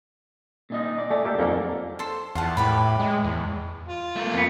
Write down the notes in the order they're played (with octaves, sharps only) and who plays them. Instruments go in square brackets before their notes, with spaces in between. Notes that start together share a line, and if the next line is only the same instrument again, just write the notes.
[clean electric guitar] A#2 D#4 D#5
D5
[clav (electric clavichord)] A3 [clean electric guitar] D5 G#5
[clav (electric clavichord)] A#3 G4 A4
[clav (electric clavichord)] F2 A#3 [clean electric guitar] F#3 D#4 F#4
[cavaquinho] A4 C5
[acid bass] E2 [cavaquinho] F4 F#5 A5
[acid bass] A2 [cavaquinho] G4 B4 B5
[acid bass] G#3
E2
[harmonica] F4
[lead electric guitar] A3 A#3
[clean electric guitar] F2 B3